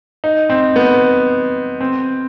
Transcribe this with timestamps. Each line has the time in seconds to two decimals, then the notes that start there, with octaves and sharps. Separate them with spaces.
0.24 D#4
0.50 C4
0.76 B3
1.81 C4